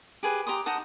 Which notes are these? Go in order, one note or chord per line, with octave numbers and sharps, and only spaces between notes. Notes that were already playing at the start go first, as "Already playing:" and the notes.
G4 G#4 B4
G4 A#5 C6 D#6
D#4 F#5 A5 D#6